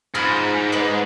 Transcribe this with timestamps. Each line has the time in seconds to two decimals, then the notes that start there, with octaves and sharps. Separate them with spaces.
0.15 G#2 F4 B5 F6
0.72 D#4 B4 D5